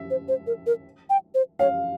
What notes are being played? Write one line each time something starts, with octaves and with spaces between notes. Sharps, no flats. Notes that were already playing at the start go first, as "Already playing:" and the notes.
Already playing: E5
C5
C5
A#4
A#4
G5
C5
C#5 F5